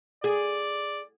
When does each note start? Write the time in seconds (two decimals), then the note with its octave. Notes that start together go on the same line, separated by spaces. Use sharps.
0.24 G#4 D5